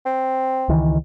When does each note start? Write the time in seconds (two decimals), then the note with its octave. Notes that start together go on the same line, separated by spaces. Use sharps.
0.06 C4
0.69 C#2 D#3 E3